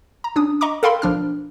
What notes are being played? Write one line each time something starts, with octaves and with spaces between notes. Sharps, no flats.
A#5
C#4 D4 D#6
D#5 A#5 C#6 D6
A4 A#4 F5 G5 B5 C6
B1 F3 D4 F6